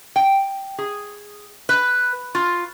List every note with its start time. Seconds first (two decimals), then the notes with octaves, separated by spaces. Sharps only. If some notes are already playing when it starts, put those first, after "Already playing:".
0.16 G5
0.78 G#4
1.69 B4
2.35 F4